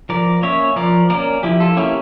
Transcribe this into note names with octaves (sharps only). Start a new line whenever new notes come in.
F3 A#4 D5
A#3 C#4 C#5 E5
F3 A#4 D5
A#3 C#4 A#4 D5
F3 E4 G4
F4 A4
A#3 C#4 E4 G4